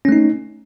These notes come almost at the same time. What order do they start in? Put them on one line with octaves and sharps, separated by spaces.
C#4 A3 D#4